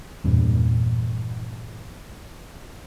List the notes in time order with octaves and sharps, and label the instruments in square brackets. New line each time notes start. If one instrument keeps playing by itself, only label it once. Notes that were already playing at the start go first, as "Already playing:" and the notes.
[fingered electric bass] E2 G2 A#2